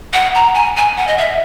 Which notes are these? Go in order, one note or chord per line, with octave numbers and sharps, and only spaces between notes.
F#5
A#5
G#5
G#5
F#5
D#5
E5